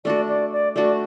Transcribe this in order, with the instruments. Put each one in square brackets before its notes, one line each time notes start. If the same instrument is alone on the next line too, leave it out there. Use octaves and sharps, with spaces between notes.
[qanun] A3 D4 F#4 [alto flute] D5
[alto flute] D5
D5
[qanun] A3 D4 F#4 [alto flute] D5